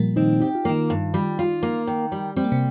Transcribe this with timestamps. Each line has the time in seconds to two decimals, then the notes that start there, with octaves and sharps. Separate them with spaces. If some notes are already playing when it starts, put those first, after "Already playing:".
Already playing: A#2 F3 G3 A#3
0.16 D#3 C4 D#4
0.40 D#4 G4
0.55 F4
0.65 D#3 A#3 D#4
0.90 G2
1.14 G3
1.39 F4
1.63 A#3
1.87 D#3
2.12 G3
2.37 G3 C4
2.44 A#3
2.52 C3 C4